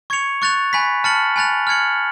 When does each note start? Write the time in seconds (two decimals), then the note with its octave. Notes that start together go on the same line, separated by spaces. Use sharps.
0.10 C#6 G#6 C#7 F7
0.42 C#6 F#6 A6 F7
0.73 G#5 B5 F#6 B6
1.04 A5 F6 A6 C#7 F#7
1.36 G#5 B5 F#6 A6 F7
1.67 F6 G#6 C#7 F#7